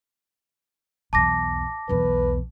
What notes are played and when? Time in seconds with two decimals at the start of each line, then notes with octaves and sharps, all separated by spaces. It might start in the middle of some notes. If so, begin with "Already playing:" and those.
1.13 B1 E2 A5 D6 A#6
1.89 B1 E2 B4